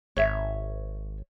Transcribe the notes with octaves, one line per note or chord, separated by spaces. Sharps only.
G#1 C#5 E5